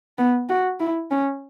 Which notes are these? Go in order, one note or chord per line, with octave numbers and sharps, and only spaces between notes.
B3
F#4
E4
C#4